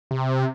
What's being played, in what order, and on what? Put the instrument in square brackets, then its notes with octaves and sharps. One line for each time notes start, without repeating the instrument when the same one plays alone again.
[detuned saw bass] C3